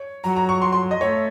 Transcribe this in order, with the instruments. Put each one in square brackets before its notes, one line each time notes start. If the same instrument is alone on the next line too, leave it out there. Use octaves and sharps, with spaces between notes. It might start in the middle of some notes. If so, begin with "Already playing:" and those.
Already playing: [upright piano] C#5
[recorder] F#3 [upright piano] A#5
[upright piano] A#5
C#6
C6
C6
D#5
[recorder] A3 [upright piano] C#5